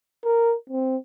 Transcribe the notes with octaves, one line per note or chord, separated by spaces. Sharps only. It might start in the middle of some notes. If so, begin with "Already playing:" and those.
A#4
C4